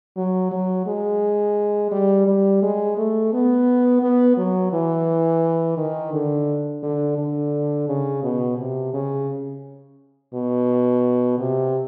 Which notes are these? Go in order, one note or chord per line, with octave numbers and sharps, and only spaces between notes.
F#3
F#3
G#3
G3
G3
G#3
A3
B3
B3
F#3
E3
D#3
D3
D3
D3
C#3
B2
C3
C#3
B2
C3